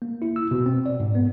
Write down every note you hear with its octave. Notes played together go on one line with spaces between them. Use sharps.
A#3
E4
E6
B2
C4
D5
G#2
B3